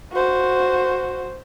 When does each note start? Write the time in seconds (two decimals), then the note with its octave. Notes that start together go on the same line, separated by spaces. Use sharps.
0.12 F#4 C5